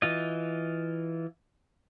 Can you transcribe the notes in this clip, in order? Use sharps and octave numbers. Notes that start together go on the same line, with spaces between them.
E3 F4 D#5